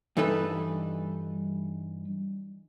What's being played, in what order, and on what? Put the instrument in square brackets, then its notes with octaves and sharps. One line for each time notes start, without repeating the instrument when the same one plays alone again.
[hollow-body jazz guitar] G2 E3 D#4 A4 B4 B5